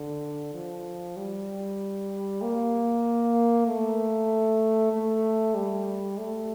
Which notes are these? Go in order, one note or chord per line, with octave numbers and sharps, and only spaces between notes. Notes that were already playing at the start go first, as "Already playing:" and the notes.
Already playing: D3
F3
G3
A#3
A3
A3
G3
A3